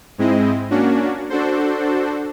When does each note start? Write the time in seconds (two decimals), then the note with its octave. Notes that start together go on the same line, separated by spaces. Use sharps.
0.18 G#2 G#3 C4 E4 D#5
0.71 A#3 C#4 D4 F#4
1.30 D4 F#4 A4 C5